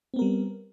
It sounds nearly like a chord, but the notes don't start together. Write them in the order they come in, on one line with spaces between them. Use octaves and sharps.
C4 B3 A#4 G3